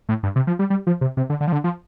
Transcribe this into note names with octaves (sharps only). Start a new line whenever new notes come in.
A2
G2
C3
F3
G3
G3
F3
C3
C3
D3
D3
F3
D3
F3